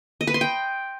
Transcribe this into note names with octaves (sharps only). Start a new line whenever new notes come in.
D#5
B4
C6
G5